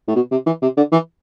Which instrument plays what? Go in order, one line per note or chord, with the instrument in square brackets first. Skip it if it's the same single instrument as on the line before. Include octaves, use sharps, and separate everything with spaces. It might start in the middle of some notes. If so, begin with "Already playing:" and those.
[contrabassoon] A2
B2
C3
E3
C3
D3
E3